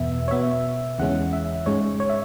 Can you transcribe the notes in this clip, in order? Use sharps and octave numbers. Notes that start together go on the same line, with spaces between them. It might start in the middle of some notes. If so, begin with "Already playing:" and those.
Already playing: E2 B2 B3 E5
C#5
B2 B3 E5
E2 C#3 E3 G#3 C#4 F#5
E5
G#2 G#3 C#4 C#5
C#5
E5